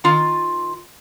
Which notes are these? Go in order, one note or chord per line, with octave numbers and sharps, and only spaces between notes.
D#3 F4